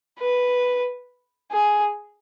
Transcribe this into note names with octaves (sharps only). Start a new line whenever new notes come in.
B4
G#4